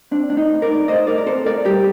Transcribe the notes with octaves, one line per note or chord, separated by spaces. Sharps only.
C4 D4
A2 D4
D#4
A2
A#4 D5
A2
A2 C5 D#5
A2 A#4 D5
A#4
C4 A4 C5
A2 A#4 D5
G3 G4 A#4